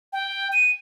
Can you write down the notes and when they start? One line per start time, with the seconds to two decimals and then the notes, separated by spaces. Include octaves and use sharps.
0.13 G5
0.52 D#7